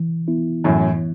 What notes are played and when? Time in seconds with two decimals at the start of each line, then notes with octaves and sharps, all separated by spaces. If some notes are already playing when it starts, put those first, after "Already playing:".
Already playing: E3
0.28 B3 E4
0.64 F#2 A2 E3